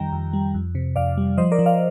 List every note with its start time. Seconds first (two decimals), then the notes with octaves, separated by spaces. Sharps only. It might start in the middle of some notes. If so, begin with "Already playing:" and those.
Already playing: F2 D#3 G3 G5 A#5
0.13 F2
0.33 G3
0.54 F2
0.75 C3
0.96 F2 D5 F5
1.17 G3
1.38 F3 C5 D#5
1.52 A#4 D5
1.59 F3
1.66 D5 F5